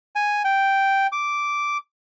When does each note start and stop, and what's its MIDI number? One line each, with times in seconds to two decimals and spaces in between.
0.16 0.42 80
0.45 1.07 79
1.12 1.78 86